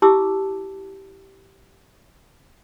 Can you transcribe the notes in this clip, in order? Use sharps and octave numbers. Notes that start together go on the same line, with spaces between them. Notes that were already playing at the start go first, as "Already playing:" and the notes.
E4 G4 A5 D6 E6